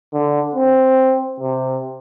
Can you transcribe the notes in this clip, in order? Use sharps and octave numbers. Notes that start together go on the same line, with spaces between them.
D3
C4
C3